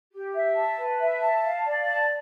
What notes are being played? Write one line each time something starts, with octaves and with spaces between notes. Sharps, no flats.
G4
E5
A5
B4
E5
A5
F5
D5
A5